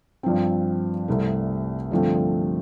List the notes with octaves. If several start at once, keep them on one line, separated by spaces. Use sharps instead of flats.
G2 F3 C4
C2 C3 A3
G2 D3 F3 A3 C4